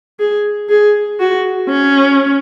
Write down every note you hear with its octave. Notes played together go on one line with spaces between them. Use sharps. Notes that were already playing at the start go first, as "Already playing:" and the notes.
G#4
G#4
F#4
C#4